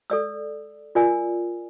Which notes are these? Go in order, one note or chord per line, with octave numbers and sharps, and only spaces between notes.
A4 D5 E6
F4 A#4 D5 G#5 E6